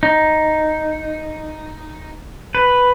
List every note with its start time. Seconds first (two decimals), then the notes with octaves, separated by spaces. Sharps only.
0.03 D#4
2.55 B4